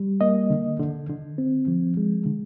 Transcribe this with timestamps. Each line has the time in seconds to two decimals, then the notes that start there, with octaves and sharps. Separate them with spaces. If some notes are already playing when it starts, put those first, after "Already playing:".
Already playing: G3
0.21 A#3 D#5
0.50 D3
0.80 D3
1.09 D3
1.38 C4
1.68 F3
1.97 G#3
2.26 D3